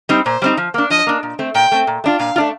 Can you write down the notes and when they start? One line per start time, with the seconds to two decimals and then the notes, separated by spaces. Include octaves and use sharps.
0.09 G3 C4 D#4
0.25 A#2 C5
0.42 G3 C4 D#4
0.57 F3
0.74 A#3 D4
0.90 F3 D#5
1.07 A#3 D4
1.23 A#2
1.39 A3 C4
1.55 A#2 G5
1.72 A3 C4
1.87 A#2
2.04 A3 D4 F4
2.19 A#2 F5
2.36 A3 D4 F4